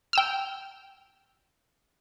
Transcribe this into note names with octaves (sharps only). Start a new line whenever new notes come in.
G5 E6 F6